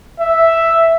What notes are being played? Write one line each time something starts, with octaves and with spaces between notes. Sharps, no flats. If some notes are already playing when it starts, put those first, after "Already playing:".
E5